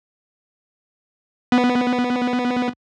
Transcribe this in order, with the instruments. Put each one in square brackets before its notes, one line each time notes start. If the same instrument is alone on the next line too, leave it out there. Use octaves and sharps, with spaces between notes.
[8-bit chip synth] B3